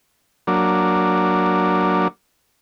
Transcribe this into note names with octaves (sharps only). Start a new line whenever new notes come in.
F#3 A#3 D4